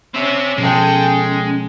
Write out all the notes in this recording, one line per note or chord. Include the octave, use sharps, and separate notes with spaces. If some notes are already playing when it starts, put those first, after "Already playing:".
C4 C#4 E5
B2 F3 G#3 C#4 A4 G5